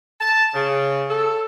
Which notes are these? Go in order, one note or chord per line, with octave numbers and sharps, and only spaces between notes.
A5
C#3
A4